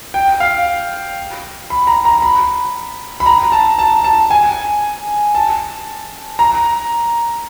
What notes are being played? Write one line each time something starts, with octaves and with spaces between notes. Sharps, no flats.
G5
F5
B5
A#5
A#5
B5
B5
A#5
A5
A5
A5
G#5
A5
A#5